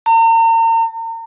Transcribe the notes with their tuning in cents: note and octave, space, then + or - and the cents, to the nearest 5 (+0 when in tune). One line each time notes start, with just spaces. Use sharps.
A#5 -40